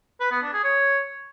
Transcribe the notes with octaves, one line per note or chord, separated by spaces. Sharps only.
B4
B3
D4
G#4
C#5